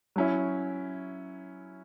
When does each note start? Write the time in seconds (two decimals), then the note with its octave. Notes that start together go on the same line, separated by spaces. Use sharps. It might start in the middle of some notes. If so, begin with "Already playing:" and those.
0.16 F#3 C#4 E4